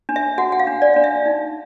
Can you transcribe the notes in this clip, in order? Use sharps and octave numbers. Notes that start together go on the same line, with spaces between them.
D4
E5
F#4 F#5
F#5
F5
D4
D5
D4 F5
E5
D#4